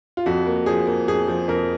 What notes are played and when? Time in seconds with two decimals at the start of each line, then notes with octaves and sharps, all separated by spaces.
0.17 F4
0.26 F2 F#4
0.46 A#3
0.66 F3 G#4
0.87 A#3
1.08 F2 G#4
1.28 F3
1.48 F2 A#4